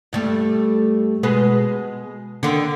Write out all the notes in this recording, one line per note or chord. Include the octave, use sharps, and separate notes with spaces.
G2 G3 A3
B2 G#3 B4
D3 D#3